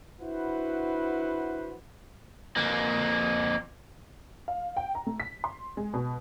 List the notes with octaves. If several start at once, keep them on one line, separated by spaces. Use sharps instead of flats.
D4 E4 F#4 B4 C5 F#5
F2 A#3
F5
G5
A#5
A3
B6
C6
G#3
B2